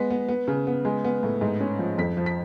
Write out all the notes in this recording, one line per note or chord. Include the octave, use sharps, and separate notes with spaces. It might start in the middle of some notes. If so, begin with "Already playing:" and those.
Already playing: G#3 B3 B6
B3
B3
C#3
B3
G#3
B3
A2
G#2
C#4
F3
F2 B6
F3
B6